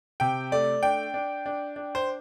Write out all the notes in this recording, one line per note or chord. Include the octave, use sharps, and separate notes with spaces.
C3 G5
A3 D5
D4 G5
D4
D4
D4
C5